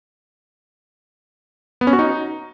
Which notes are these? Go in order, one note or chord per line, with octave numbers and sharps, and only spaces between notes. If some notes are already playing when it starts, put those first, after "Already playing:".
B3
C#4
F#4
D#4